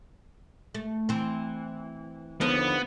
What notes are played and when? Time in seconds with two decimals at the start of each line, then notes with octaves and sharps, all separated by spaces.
0.74 A3
1.09 E3 C4
2.41 D#2 D3 F3 B3